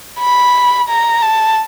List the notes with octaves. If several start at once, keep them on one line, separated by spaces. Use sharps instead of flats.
B5
A#5
A5